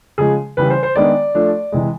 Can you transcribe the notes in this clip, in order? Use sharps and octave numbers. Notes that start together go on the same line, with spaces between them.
C#3 F3 G#3 G#4
C#3 E3 G3 B4
C5
C5
D#3 G#3 B3 D4 D5
F3 A3 D4
C3 E3 G#3